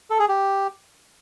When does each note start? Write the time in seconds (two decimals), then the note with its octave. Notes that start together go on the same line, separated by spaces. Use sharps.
0.10 A4
0.19 G#4
0.28 G4